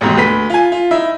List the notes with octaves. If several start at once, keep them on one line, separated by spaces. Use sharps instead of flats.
A1 D#2 G#2 B2
D2 B4 B6
F4 G#5
F4
D#4 E4 E5